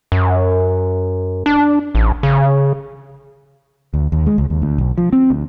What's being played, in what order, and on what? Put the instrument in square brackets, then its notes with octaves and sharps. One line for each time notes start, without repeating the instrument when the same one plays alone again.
[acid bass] F#2
D4
A1
C#3
[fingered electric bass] D2
D#2
G#3
C#2
D#2
D2
B1
F3
C4
D2